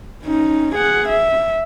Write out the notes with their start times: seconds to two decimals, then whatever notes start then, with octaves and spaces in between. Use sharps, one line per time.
0.24 C#4 D#4
0.75 G#4 F#5
1.08 E5